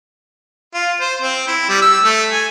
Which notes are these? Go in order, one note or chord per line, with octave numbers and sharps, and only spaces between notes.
F4
C5
C4
E4
G3
E6
A3
G#5